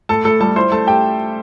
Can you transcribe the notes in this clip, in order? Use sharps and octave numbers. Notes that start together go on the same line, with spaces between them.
A2 A4 A5
A2 A4 A5
G3 A4 A5
E4 C5 C6
A3 A4 A5
A3 G4 G5